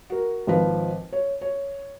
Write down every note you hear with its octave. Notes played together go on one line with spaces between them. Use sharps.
F#4 A#4
G#1 F3 B4
C#5
C#5